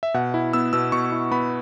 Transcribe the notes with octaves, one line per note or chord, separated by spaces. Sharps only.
E5
B2 F#5
E4
B3 E6
B2 E6
B2 C#6
E4
B3 B5